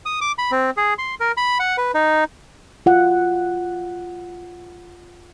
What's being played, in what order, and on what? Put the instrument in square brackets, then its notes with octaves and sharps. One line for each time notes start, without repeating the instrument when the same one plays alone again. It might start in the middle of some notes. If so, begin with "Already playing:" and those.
[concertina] D#6
D6
B5
C4
G#4
C6
A#4
B5
F#5
B4
D#4
[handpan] F4 F#5